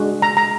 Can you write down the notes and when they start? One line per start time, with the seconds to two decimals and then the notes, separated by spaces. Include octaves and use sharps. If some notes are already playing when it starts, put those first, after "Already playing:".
Already playing: G#3 D4 F#4
0.22 A#5
0.37 A#5